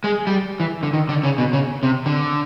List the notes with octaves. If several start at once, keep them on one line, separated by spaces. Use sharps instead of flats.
G#3
G3
E3
D3
D#3
D3
C#3
B2
C#3
C3
D3